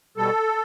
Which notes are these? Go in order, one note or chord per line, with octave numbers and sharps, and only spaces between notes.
B2 G3 A4